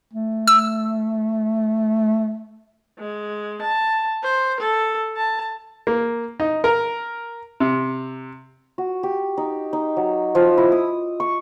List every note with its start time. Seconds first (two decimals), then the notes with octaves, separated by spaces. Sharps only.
0.14 A3
0.48 E6
2.99 G#3
3.62 A5
4.24 C5
4.60 A4
5.16 A5
5.87 A#3
6.40 D#4
6.64 A#4
7.60 C3
8.78 F#4
9.03 G4
9.37 D#4
9.73 D#4
9.97 F#3
10.35 F3
10.57 E4
10.72 D#6
11.20 C#6